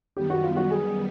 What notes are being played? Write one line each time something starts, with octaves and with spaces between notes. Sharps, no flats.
F#2 D#3 G3 B3 G4
F#4
F4
F#4
G#4